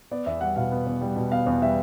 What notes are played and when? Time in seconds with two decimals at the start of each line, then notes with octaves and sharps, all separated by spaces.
0.11 B3 D5
0.26 E2 E5
0.41 G3 F#5
0.56 B2 F5
0.71 B3
0.87 E2
1.01 G3
1.16 B2
1.31 B3 F5
1.46 E2
1.62 G3 E5